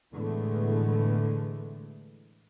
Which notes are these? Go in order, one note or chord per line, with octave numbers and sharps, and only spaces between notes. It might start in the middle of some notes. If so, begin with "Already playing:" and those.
A2 D3 E3 G#3 A3 B3